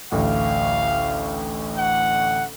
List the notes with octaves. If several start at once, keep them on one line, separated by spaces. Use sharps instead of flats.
A1 D2 F5
F#5